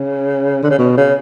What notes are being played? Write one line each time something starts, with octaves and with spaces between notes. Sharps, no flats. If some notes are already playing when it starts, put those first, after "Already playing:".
Already playing: C#3
D3
C#3
B2
C#3